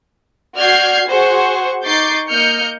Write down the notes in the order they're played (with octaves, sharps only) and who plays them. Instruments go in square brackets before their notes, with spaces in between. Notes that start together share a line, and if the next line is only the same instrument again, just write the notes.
[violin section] F#4 D5 F6 G6 G#6 C7
F#4 G#4 C5 F#5 C#6
D#4 C#6 D6 G6 A6 C7
A#3 D#5 F6 G6 C#7